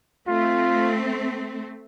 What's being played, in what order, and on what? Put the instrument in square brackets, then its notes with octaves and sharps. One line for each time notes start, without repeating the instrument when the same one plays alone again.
[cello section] A3 C4 [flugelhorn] F4